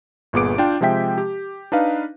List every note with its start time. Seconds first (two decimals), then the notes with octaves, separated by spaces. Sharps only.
0.33 G1 A#2 B3 G#4 D6 D7
0.58 D4 F4 G5
0.81 C3 F3 G#3 E5 G5 B6
1.18 G4
1.72 D4 D#4 B4 F5